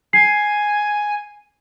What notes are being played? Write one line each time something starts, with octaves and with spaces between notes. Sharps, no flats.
G#5 C7